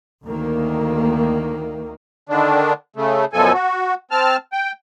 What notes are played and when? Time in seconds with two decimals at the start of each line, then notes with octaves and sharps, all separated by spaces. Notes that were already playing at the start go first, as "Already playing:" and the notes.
0.24 D2 D#3 A#3
2.29 D3 D#3 D4
2.96 C#3 A3
3.33 F#2 B2 F3 A4 G#5
3.53 F#4
4.11 C4 A5 F6
4.53 G5